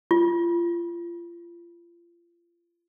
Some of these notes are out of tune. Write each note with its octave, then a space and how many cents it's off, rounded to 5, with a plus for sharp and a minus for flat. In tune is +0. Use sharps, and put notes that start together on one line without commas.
F4 -30